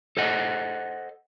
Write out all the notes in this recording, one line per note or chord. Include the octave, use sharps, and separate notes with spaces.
A4 C5 D#5 F#5